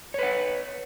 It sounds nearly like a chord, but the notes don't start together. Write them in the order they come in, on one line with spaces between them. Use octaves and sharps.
C#5 B4 F#5